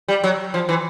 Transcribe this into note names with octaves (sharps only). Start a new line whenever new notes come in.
G3
F#3
F3
E3